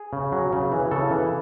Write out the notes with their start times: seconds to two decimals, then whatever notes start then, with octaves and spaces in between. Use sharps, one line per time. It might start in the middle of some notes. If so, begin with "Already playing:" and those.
Already playing: G#4
0.13 C#3
0.32 F#3
0.53 C#3
0.72 E3
0.91 C#3 A4
1.11 E3